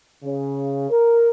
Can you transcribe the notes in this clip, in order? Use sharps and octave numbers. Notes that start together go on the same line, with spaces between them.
C#3
A#4